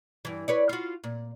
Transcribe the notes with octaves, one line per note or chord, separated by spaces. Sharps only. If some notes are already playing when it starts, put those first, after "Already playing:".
G2 E3
B4 C#5 D5
F4 F#4
A#2